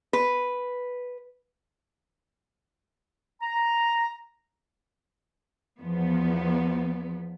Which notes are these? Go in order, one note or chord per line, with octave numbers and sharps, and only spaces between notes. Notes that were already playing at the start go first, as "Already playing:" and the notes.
B4
A#5
E2 F3 B3